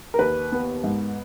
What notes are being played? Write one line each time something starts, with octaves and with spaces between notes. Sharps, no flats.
A#4
D#2 B4
B3
G#2